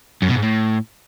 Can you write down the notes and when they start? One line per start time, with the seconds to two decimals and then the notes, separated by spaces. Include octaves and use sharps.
0.22 F#2
0.29 B2
0.36 G#2
0.43 A2